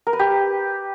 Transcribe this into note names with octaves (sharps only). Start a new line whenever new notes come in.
A#4
B4
G4